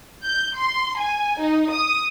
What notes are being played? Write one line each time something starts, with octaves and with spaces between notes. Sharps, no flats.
G6
C6
G#5
D#4
D#6